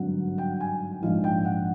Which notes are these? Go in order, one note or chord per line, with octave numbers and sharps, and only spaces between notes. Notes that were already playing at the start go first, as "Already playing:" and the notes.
Already playing: G#1 G2 D3 F#3 F#5
G5
G#5
A#1 G#2 F3 F5
G5
F#5